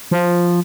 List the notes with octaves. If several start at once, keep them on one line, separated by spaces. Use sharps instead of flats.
F3